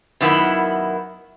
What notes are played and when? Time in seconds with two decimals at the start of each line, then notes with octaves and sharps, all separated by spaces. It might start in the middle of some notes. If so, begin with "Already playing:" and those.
0.21 F#2 D#3 B3 E4 F#5